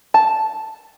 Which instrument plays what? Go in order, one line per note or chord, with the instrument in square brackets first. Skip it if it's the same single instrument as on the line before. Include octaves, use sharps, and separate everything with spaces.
[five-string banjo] A5